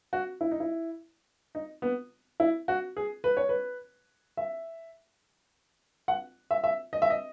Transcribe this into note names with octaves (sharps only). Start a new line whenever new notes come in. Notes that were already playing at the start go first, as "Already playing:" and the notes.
F#4
E4
D#4
E4
D#4
B3
E4
F#4
G#4
B4
C#5
B4
E5
F#5
E5
E5
D#5
E5
D#5